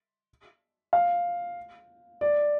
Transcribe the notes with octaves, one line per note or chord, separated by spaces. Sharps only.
F5
D5